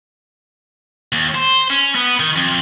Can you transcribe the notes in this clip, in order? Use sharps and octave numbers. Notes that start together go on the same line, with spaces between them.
D#2
C5
C#4
B3
D#3
F2